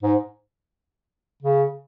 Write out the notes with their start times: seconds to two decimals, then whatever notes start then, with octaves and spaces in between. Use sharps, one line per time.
0.03 G#2
1.43 C#3